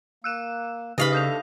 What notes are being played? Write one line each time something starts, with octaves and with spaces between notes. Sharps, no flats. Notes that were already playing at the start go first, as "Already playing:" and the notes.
A#3 E6 F#6 E7
C#3 D#4 G4 B4 D#5 F5 B5
A3 D4 A4 D#6 G6 F7